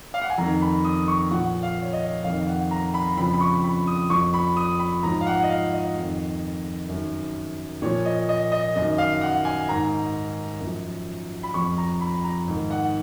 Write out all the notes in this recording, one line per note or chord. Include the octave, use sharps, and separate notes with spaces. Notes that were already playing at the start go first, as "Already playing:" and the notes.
F5
F#5
G#5
F2 D#3 A#5
B5
D#6
C#6
A#2 F3 F#5
F5
C#5
D#5
F2 D#3 F5
F#5
A#5
B5
F2 C#3 F3 B5
B5
C#6
B5
D#6
F2 F3 C#6
B5
D#6
B5
G#2 F3 A#5
F5
F#5
D#5
F5
D#5
F2 D#3
F#2 D#3
A#2 F3 C#5
D#5
D#5
D#5
F#2 D#3 D#5
F5
F#5
G#5
G#2 D#3 A#5
F#2 F3
B5
F2 F3 C#6
A#5
B5
A#5
G#2 D#3
F#5